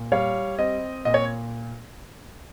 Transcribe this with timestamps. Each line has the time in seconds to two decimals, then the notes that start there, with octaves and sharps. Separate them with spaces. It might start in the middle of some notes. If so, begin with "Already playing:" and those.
Already playing: A#2
0.12 G3 C#5 F5
0.59 C4 D#5
1.05 A#2 D#5
1.14 C#5